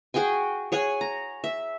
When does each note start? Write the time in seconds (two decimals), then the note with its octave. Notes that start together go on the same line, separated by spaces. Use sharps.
0.14 F#4 G#4 G5 G#5
0.72 G#4 C#5 F#5 G#5
1.01 A#5
1.44 E5